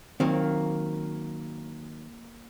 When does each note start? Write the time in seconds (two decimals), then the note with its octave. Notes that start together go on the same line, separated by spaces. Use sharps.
0.20 D#3 F#3 A#3 C4